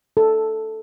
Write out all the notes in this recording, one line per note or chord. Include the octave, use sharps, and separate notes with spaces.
A4